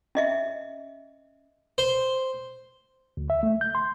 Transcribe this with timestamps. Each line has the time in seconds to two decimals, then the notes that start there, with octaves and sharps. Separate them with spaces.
0.15 C#4 D#5 E5
1.78 C5
3.17 D2
3.30 E5
3.43 A3
3.61 G6
3.75 C6